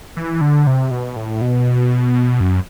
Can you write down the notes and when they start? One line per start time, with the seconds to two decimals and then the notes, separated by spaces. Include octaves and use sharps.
0.17 E3
0.41 D3
0.67 C3
0.91 B2
1.16 A2
1.42 B2
2.40 F#2